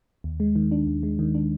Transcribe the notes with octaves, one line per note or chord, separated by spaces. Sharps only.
D#2
G#3
D#3
D4
D#2
G#3
D#3
D4